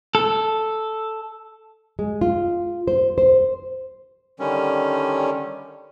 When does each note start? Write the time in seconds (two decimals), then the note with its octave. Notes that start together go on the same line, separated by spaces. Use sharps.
0.15 A4
1.99 G#3
2.21 F4
2.88 C5
3.18 C5
4.39 D3 D#3 G3 C#4